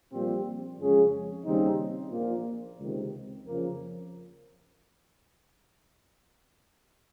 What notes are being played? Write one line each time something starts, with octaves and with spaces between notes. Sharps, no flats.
A#1 A#2 G3 C4 G4
F2 C#3 G#3 C#4 G#4
D#2 C#3 G3 C4 D#4
A#1 A#2 F3 A#3 F4
C#2 C3 D#3
F2 C#3 F3 A#3